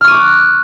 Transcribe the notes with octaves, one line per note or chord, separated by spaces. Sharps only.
C#6 D6 F6 F#6 D#7